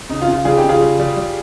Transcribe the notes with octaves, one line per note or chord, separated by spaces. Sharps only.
C#3 D#4
F4
C#3
F4
G3 F4 G#4
D#4 G4
C#3
F4 G#4
G3
G3
G3